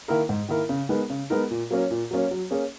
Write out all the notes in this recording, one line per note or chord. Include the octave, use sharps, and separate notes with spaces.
D#3 A#3 E4 A#4
G#2
D#3 A#3 E4 A#4
C#3
G#3 B3 D#4 A#4
C#3
G#3 B3 D#4 A#4
A#2
F#3 A#3 C#4
A#2
F#3 A#3 C#4
F#3
A#3 C#4 G#4